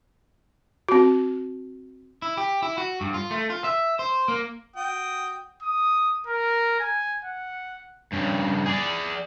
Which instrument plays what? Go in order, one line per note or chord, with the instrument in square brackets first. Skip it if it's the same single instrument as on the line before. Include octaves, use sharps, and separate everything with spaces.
[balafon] C4 F#4
[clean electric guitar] E4
G4
E4
F#4
G2
F4
A3
F4
E5
C5
A#3
[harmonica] F#4 G5 D#6
[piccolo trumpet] D#6
A#4
G#5
F#5
[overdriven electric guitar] G2 C#3
G#4 D5